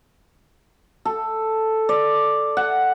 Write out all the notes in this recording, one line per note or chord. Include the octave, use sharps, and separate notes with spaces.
A4
D5
F#5